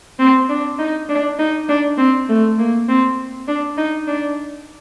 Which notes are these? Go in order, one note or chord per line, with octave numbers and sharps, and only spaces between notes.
C4
D4
D#4
D4
D#4
D4
C4
A3
A#3
C4
D4
D#4
D4